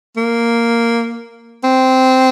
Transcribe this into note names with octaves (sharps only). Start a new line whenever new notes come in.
A#3
C4